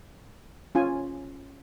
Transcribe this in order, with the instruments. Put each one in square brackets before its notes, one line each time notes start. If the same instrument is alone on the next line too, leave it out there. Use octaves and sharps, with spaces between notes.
[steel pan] C#4 F4 G#5